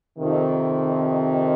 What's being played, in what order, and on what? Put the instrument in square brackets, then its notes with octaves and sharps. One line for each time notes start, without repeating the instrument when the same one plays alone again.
[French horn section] F2 C3 D#3